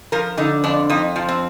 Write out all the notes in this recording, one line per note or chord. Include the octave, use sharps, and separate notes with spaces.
F3 A#4
D3 D#4
F2 D4
F2 D#4
F3
C4